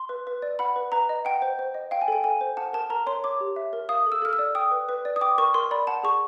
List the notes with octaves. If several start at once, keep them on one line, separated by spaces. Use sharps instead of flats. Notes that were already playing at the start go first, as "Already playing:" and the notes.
Already playing: C6
B4
B4
D5
F#5 B5
B4
B4 A#5
D#5
F#5 G5
C5
C5
D#5
F5 G5
G#5
A4 G5
A4 G#5
C5
F#5 A5
A#4 A5
A#4 A#5
C#5 C6
C#5 D6
G4
E5
A#4
F5 D#6
A4
E6
A4 F6
E6
D5
G5 D#6
B4
B4
D5
D#6
G5 D6
A#4 C#6
A#4 C6
D5 B5
F#5 A5
G#4 C#6